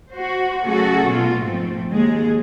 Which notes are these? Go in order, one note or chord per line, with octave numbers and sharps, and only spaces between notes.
F#4 C5
C#3 F#3 A3 F#4 G#4 A4
B2 F4
G#2 F3 A3 C4
D#2 G#3 G#4